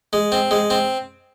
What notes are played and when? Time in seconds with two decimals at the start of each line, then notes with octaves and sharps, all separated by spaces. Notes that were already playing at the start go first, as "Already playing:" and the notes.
0.13 G#3
0.32 C4
0.51 G#3
0.70 C4